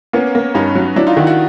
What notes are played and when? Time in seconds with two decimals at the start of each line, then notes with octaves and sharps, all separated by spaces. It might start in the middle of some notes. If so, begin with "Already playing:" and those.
0.13 A#3 B3 C#4
0.35 A#3
0.55 G2 C#4 D#4
0.75 F#3
0.96 F#3 D4 E4
1.07 D#4 F4
1.16 D#3 E4 F#4
1.27 E4 F#4